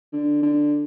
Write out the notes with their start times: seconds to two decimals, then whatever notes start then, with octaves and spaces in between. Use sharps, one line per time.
0.13 D3
0.42 D3